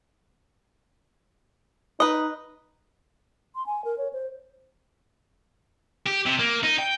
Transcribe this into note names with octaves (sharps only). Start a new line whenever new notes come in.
D#4 B4 D#5
C6
G#5
A#4
C#5
C5
G4
C3
A#3
D#4
G5